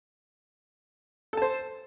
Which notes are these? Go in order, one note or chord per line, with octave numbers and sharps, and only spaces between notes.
A4 C5 A5